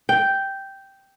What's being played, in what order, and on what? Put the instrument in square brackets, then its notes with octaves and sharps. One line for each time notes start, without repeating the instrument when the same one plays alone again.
[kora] G5